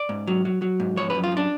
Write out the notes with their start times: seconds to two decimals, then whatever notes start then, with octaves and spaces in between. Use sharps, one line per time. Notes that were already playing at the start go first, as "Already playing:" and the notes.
Already playing: D5
0.09 G#2
0.27 F#3
0.45 F#3
0.62 F#3
0.80 G#2
0.96 F3 C#5
1.10 B4
1.15 F#2
1.24 F4
1.32 F#2
1.37 D4